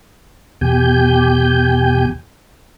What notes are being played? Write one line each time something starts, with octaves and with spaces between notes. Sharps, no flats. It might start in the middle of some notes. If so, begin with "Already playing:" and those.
E2 B2 G4 G#5 G6